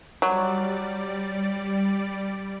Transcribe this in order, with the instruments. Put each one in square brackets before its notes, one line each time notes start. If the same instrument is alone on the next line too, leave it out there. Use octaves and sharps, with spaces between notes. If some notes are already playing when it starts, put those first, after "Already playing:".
[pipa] F#3 [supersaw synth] G3 D5